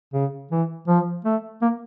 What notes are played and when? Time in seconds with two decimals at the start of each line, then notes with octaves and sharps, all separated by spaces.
0.14 C#3
0.51 E3
0.88 F3
1.25 A3
1.62 A#3